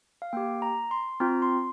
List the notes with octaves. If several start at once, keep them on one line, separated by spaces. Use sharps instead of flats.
F5
A#3 G4 G5
A#5
C6
C4 F4 A#5
C6